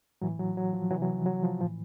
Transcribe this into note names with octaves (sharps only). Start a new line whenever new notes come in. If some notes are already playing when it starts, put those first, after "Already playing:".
A2 E3 F#3
F#3
F#3
F3
C3 E3 F#3
F#3
F3
F#3
F3
A2 E3 F3